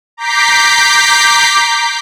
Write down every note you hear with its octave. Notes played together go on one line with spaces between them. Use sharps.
A#5 D6 G6 B6 C7